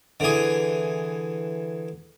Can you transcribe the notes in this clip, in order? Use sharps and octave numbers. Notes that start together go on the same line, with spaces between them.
D3 E3 G#4